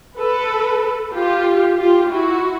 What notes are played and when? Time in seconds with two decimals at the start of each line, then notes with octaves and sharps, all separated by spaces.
0.17 A4 B4
1.14 F4 G4
1.78 F4 G4
2.10 E4 F#4